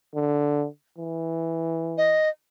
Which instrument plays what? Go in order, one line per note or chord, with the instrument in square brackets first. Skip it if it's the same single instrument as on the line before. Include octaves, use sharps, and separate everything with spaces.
[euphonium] D3
E3
[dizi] D#5